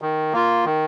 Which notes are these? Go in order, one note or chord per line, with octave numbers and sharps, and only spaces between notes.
D#3
A#3 F4
D#3